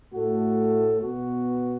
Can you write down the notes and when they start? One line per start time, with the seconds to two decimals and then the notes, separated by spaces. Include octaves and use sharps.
0.14 A2 A3 F#4 A4
1.02 B2 B3 F#4